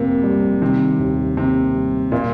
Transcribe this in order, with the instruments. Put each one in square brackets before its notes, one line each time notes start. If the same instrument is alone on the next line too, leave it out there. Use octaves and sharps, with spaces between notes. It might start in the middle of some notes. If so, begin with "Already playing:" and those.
Already playing: [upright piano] F2 A#3 [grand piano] C3
[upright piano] G3
[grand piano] C3 [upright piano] D#3
[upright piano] D#2
[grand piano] C3 [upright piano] A#3
[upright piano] G3
[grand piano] A#2 [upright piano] G3